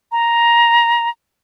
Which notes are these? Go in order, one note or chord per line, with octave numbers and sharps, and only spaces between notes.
A#5